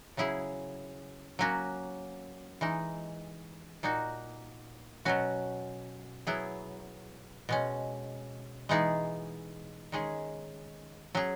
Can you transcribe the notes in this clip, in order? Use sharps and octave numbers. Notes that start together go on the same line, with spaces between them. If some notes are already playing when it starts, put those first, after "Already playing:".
C#3 F#3 C#4 E4 G#4
F#3 A#3 C#4 F#4
E3 G#3 D#4
A#2 A#3 D#4 F#4
B2 F#3 C#4 F#4
F#3 B3 E4 G#4
B2 G#3 C#4
E3 G#3 B3 D#4 G#4
D#3 G#3 C#4 G#4
F#3 C#4 G#4